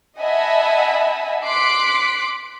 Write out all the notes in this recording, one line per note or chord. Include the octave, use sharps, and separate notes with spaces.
D#5 E5 F#5 G#5 A5 B5
C6 D6 F#6 B6 C7 D7